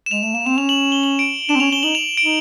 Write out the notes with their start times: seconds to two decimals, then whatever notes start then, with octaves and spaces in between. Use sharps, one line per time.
0.06 E7
0.11 G#3 F7
0.22 A3 E7
0.34 A#3 E7
0.46 C4 E7
0.57 C#4 F7
0.69 F#7
0.80 F#7
0.92 G7
1.03 F#7
1.19 D7
1.49 D4 E7
1.56 C4
1.60 C#4 F7
1.71 C#4 G7
1.83 D#4 F#7
1.95 F7
2.17 D7
2.25 D#4